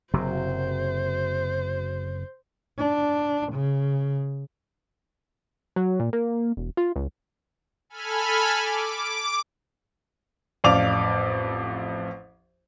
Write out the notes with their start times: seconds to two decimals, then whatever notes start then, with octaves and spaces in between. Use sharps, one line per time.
0.13 F#1 C3 F#3 C5
2.78 D4
3.52 C#3
5.76 F#3
6.00 A#2
6.13 A#3
6.57 E1
6.77 F4
6.96 C#2
7.90 A4 G#5 B5 F6
8.62 D6
10.64 A1 F2 D5 F5 D6 F7